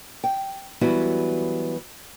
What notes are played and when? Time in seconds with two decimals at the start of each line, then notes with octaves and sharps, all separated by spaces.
0.24 G5
0.81 E3 F#3 G3 B3 E4 F#4